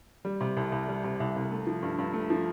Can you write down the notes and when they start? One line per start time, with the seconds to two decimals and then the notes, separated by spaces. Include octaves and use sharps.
0.25 G3
0.41 C3
0.57 C2
0.72 C2
0.88 G3
1.04 C3
1.20 C2
1.36 C2
1.51 A3
1.67 F3
1.83 G2
1.99 G2
2.14 A3
2.30 F3